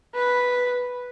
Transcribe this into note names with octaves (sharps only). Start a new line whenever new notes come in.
B4